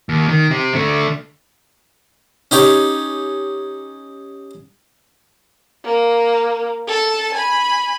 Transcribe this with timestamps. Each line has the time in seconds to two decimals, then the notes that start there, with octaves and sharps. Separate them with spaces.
0.09 D#2
0.29 D#3
0.51 C4 G4
0.74 D3 A3
2.51 C#4 D#4 G4 C#5
5.84 A#3
6.88 A4 A5
7.34 G#5 B5